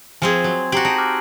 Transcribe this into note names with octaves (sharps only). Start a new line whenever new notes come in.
F3 C4 G#4 G#5 C6 G#6
F#3
F#4 G4 A#5 C7 F#7
D#4 A5 A#5 D7
D6 F6 F#6